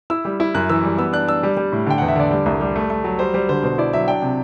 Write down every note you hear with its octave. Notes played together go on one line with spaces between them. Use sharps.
E4 E6
G3
E4
F#2 F#6
E3 E6
G3
B3 E6
D4 F#6
D4 E6
G3
G3
A2
D3 G5
F#5
E2
E5
D3 D5
G3
C2
G3
A3
A3
F#3
G3 C5
G3 C5
D3 C5
B2 C5
E4 D5
F#3 E5
D4 G5
C3